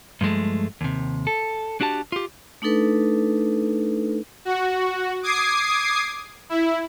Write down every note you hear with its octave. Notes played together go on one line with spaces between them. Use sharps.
G2 F3 G#3 A3
D#2 C3
A4
D4 F#4 G4 A5
F4 G4
A3 D4 D#4 A4 B4
F#4
D6 D#6 G#6 C7
E4